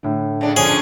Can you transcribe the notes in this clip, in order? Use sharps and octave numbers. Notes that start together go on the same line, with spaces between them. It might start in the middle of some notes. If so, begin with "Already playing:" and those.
A2 D3
C#3 D4
D3 F3 C#4 G#4